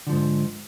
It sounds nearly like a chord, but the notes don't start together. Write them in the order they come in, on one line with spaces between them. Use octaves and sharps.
D3 F3 G#2